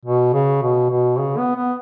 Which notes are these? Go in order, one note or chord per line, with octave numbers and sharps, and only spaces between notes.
B2
C#3
B2
B2
C#3
B3
B3